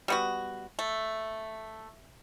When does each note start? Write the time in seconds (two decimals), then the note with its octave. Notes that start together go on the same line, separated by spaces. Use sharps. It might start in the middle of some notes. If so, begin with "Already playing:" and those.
0.08 G3 B3 F#4
0.79 A3